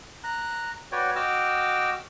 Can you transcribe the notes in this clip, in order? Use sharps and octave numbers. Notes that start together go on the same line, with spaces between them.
A#5 F#6
F#4 B4 C#5 D5 G5
F#4 D#5 G5 D6 E6 F6